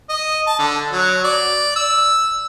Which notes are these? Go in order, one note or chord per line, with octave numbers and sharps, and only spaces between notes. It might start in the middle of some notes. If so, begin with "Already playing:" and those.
D#5
A5
D3
F#3
D5
E6